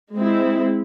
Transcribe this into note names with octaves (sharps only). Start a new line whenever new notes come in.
G#3 C4 E4